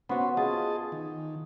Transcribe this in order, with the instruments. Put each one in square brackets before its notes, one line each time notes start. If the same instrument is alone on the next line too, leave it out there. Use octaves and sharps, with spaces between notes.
[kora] B3 F#4 [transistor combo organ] C#4 B4 C5
[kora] F4 [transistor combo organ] G#4 D#5 A5
[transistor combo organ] D#3